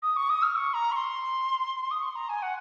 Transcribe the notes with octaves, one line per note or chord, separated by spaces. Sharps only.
D#6
C#6
D#6
F6
C#6
A#5
C#6
C6
D#6
C#6
C6
A#5
G#5
F#5